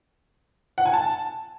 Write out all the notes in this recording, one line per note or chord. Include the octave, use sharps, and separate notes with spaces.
F#5
G#5
A5